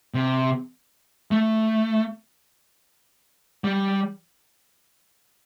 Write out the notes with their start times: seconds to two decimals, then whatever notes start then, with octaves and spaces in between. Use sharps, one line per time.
0.14 C3
1.31 A3
3.64 G3